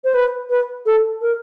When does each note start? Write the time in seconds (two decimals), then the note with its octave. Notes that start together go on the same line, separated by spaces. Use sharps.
0.04 C5
0.14 B4
0.50 B4
0.86 A4
1.21 A#4